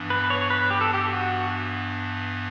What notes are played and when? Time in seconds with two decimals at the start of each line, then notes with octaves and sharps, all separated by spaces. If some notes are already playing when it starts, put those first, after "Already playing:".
Already playing: G2 E3 B3 D4
0.10 B4
0.30 C#5
0.50 B4
0.71 G4
0.81 A4
0.93 G4
1.09 F#4